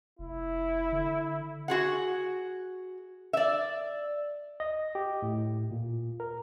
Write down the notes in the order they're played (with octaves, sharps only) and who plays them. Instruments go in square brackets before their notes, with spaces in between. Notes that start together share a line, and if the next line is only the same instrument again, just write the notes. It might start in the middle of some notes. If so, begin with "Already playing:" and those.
[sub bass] F1 [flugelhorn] E4
[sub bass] D3
[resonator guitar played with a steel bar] F#4 G#4 F#5
D5 E5
[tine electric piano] D#5
G4
A2
A#2
A#4